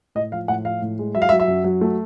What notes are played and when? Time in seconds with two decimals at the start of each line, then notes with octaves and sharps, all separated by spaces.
0.15 A2 D#5
0.32 F3 F5
0.48 A2 F#5
0.65 F3 F5
0.82 A2
0.99 G#3
1.15 F#3 E5
1.22 F5
1.29 E5
1.32 F#3
1.40 E5
1.48 F#2
1.64 F#3
1.81 A3